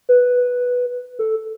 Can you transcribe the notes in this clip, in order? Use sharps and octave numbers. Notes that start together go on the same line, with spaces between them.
B4
A4